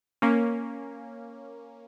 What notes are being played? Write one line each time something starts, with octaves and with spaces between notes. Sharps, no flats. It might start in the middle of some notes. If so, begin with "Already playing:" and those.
A#3 C#4